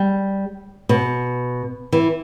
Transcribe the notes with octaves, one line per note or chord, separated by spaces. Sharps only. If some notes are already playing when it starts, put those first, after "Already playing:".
Already playing: G3
B2
E3